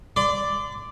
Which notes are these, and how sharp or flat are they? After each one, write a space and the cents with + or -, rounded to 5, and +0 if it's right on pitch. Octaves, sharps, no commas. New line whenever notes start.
D5 +0 C6 -40